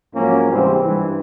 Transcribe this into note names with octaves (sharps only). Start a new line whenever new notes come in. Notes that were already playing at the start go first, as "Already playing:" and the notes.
G#2 F3 F#3 A#3 C#4
G#2 C3 E3 G3 C4
G2 E3